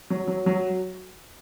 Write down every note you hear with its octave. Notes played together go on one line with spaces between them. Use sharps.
F#3
F#3
F#3